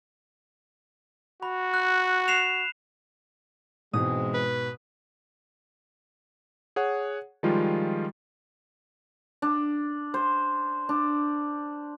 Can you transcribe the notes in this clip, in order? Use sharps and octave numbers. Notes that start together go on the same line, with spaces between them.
F#4 B5
F#6
C7 E7 F7
G#2 B2 E3 G#3 C4 D#6
B4
G#4 C#5 F#5
D#3 F3 G3 G#3 F4
D4
C5
D4